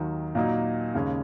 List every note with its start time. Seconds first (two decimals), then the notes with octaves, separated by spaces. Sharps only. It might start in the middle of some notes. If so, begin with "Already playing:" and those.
Already playing: D#2 D#3 F#3
0.35 A#2 F#3 A#3 D#4
0.94 D#2 C#3 G#3 C#4